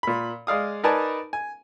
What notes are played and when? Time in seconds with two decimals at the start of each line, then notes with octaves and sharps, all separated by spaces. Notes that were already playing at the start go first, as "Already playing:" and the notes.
0.03 A#2 B5
0.47 G#3 D5 F5 D#6
0.83 D#4 A#4 B4 D5 G#5 A5
1.33 G#5